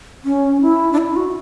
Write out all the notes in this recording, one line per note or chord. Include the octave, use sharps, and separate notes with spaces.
C#4
E4
D4
E4
F#4